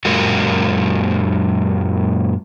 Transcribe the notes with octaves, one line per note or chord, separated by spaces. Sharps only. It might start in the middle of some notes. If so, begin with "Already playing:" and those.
F#2 A#2 G#3 A#3 F#4